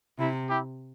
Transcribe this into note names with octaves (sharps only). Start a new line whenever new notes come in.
C3 E4
E4 G4